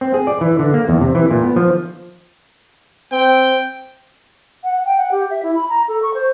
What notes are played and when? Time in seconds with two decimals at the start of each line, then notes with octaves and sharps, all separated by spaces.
0.01 C4
0.14 G#4
0.27 D5
0.41 E3
0.59 D3
0.74 A#3
0.89 E2
1.01 C3
1.15 E3
1.31 A#2
1.43 B3
1.56 F3
3.12 C4 G5
4.64 F#5
4.86 G5
4.98 F#5
5.11 G4
5.30 E5
5.43 E4
5.55 B5
5.69 A#5
5.88 A4
6.03 C#6
6.14 C5